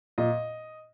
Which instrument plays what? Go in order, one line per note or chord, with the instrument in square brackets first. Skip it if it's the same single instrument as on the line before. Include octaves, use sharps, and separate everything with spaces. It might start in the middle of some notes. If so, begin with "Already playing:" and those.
[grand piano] A#2 D#5